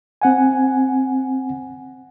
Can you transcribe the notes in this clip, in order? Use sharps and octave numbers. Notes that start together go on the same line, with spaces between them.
C4 F#5 G#5